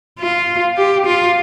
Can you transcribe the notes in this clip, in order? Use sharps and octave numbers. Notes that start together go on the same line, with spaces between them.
F4
G4
F4